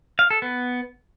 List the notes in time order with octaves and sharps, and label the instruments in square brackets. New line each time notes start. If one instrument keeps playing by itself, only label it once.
[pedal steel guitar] F5
A4
B3